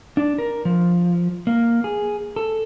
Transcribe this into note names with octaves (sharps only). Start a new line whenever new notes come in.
D4
A#4
F3
A#3
G#4
A4